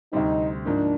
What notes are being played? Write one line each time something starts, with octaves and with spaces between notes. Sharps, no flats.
D2 C3 G3 C4 D#4
G#2 F3 A#3 D4